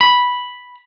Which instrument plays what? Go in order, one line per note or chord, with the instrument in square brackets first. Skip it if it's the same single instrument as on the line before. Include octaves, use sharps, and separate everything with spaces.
[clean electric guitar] B5